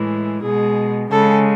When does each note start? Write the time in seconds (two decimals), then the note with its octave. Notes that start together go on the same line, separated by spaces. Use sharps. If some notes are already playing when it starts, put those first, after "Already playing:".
Already playing: A2 E3 G#3
0.43 B2 G#3 G#4
1.10 C#3 G#3 A4